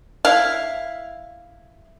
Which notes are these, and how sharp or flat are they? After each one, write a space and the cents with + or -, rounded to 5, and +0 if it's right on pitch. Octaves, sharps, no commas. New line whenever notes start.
E4 +5 F5 +0